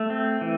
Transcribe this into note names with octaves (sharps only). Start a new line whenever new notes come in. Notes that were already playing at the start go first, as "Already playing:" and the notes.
Already playing: A3
C4
E3